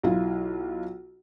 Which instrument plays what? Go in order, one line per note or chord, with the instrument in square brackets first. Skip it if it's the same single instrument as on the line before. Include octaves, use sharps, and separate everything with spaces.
[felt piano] B1 E4 F4